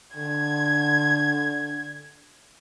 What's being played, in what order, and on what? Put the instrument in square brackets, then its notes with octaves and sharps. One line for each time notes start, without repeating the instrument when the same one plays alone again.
[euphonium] D3 [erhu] G#6